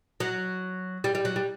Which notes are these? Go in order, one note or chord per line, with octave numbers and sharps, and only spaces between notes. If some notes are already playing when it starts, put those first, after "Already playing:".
F#3
G3
G3
F#3
G3